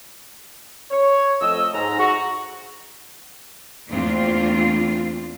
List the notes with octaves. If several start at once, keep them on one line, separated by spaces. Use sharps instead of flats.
C#5
F2 A3 D#5 E6
G#2 A#5
F#4
E2 A3 A#3 C4 D4 F4